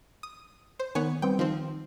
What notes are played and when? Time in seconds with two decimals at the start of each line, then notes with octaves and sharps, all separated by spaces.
0.23 D#6
0.79 C5
0.95 D#3 B3 C#5 G#5
1.22 G3 B3 C4 G5
1.39 D#3 F3 C4